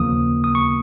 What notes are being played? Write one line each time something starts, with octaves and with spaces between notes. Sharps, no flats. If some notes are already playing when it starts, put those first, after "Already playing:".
Already playing: D#2 C#3 F3 A#3 D#6
D#6
C#6